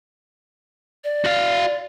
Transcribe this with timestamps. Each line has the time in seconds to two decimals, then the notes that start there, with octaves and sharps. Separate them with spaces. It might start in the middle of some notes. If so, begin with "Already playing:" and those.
1.04 D5
1.25 F#4 F5